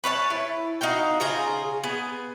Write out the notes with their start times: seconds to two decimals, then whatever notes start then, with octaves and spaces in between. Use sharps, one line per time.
0.04 B4 C#5 F5 A5
0.30 E4
0.81 D#4 F#4 F5 G5
1.20 C#3 F4 G#4 A#5
1.84 B3 G#4